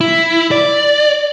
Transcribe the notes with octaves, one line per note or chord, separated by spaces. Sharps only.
E4
D5